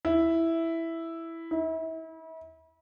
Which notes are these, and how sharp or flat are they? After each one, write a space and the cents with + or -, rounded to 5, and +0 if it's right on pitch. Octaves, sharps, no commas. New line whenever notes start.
E4 +0
E4 -35